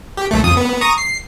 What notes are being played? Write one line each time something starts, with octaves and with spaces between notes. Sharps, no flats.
G4
B1 A3
F2 D#6
B3
A#5 C#6 D#6
C7